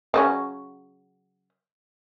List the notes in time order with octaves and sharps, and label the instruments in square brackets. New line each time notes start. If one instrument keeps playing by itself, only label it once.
[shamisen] C#3 F#3 C#4